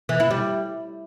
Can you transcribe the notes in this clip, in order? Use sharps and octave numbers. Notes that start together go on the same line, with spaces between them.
E3
E4
G3